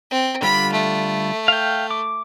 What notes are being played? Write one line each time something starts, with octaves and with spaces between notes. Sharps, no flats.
C4
D3 G3 F4 B5
A3
F5 G5
D6